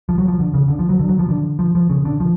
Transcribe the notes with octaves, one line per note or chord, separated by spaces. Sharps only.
F3
F#3
F3
D3
C#3
D3
F3
F#3
D3
F#3
F3
D3
F3
F3
C#3
D3
F3